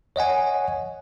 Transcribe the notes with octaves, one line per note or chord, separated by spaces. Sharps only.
C#5 D#5 F#5 G#5